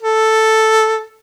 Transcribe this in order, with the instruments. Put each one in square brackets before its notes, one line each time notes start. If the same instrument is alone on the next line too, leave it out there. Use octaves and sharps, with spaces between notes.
[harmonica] A4